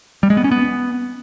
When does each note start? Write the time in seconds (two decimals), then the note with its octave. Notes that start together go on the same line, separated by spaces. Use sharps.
0.23 G3
0.30 G#3
0.37 B3
0.44 C#4
0.51 B3